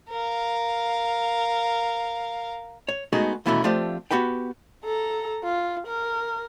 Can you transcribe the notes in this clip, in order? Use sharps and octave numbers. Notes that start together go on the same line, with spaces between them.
A#4 F5
C#5
G#3 A3 B3 D#4 F#4 G#4
D#2 B2 E3 A3 C#4 E4
F3 A3 C4 F4 G4 D5
B3 F#4 G4 B4 G5
A4 A#5
F4
A#4